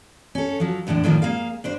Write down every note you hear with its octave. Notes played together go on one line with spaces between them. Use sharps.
C#4 A4
F3 F#3
E2 A2 D3 D4
A2 D#3 F3 A#3
A#3 G#4 F5
G2 D4 C5